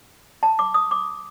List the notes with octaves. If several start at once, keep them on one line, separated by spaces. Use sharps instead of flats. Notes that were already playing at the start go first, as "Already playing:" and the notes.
A5
D6
D#6
D6